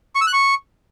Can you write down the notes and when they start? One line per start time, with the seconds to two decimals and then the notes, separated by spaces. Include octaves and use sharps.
0.15 C#6
0.21 E6
0.27 F#6
0.33 C#6